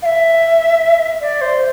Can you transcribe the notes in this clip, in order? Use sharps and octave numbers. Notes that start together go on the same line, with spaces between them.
F5
E5
D5
C5